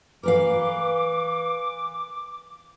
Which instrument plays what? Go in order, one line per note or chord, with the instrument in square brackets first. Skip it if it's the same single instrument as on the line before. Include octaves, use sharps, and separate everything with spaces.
[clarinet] E3 [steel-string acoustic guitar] A#4 B4 F5 [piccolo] D6